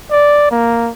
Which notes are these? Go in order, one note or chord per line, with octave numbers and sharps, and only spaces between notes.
D5
A#3